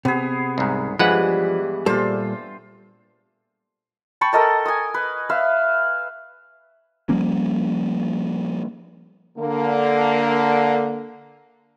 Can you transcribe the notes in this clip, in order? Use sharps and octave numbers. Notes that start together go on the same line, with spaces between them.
C3 B3 G#4
C2 G#2
G2 E3 F3 G#3 B4 F#5
A#2 G3 F4 A4 C5
G5 A5 B5 C#6
A4 A#4 D#5 A5
G#5 D#6
B4
B4 E5 F5
F3 G3 A#3 C#4
D3 A#3